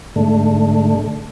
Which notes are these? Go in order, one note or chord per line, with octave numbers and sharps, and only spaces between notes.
G#2 D3 A3